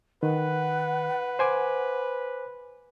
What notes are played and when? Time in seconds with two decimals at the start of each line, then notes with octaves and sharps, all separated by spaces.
0.23 D#3 B4 F#5
1.39 C5 G#5 D6